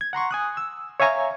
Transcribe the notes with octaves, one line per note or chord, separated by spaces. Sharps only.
G#6
F#5 A#5 C6 C#6
G#5 D#6 F#6
E6
C#5 E5 F5 G#5 A#5 C#6